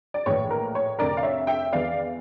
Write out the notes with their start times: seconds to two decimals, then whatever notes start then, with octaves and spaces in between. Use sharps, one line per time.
0.14 D5
0.26 A#1 A2 E3 C#5
0.50 A#4
0.75 C#5
0.99 F1 F2 D3 A#4 D5
1.17 F5
1.23 C#5 E5
1.47 E5 G5
1.72 E2 E3 D5 F5